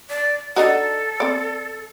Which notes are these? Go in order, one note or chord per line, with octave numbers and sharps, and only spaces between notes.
D5
D4 D#4 F#4 A4
C4 D5